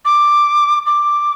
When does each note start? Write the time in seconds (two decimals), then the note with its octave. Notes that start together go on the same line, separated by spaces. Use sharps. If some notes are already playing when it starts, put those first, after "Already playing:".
0.05 D6
0.86 D6